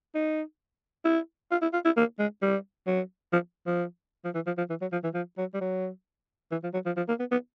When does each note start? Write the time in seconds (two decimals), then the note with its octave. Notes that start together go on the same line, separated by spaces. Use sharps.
0.15 D#4
1.05 E4
1.51 F4
1.62 E4
1.73 F4
1.85 E4
1.97 A#3
2.19 G#3
2.42 G3
2.87 F#3
3.33 F3
3.66 F3
4.24 F3
4.35 E3
4.46 F3
4.58 F3
4.70 E3
4.81 F#3
4.92 F3
5.04 E3
5.14 F3
5.38 F#3
5.54 G3
5.61 F#3
6.51 E3
6.63 F3
6.74 F#3
6.86 F3
6.97 F3
7.09 A#3
7.19 B3
7.31 B3